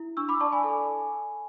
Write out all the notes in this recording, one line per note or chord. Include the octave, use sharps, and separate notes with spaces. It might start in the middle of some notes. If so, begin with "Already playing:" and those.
Already playing: E4
D4 C#6 E6
B5 D6
D5 A5 C#6
G#5 B5
A4